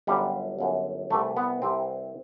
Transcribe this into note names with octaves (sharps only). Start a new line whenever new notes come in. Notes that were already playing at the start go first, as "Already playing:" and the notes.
G1 F#2 D3 G3
G1 F#2 D3
C2 C3 E3 A3
B3
C2 C3 E3 C4